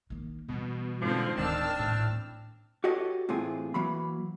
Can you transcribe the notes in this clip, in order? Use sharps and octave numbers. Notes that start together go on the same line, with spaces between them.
D#3 A#3
B2 E3 G3
G#2 D3 F3 C4
D1 D#3 C4 D4 A5 E6 F6
D#1 A1 A2
F#4 G4 A4 C#5 D#5 G5
A2 C3 E3 C4 F4 G#4
E3 F#3 A#3 B5